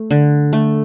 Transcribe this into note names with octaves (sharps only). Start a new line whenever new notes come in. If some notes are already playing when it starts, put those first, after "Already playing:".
Already playing: A3
D3
A3